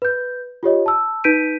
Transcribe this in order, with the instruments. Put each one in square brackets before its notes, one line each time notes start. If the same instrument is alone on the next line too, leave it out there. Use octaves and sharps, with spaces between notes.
[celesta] B4 G6
F4 G4 C#5 D#5
A5 E6
D#4 B4 G6 B6 D7 D#7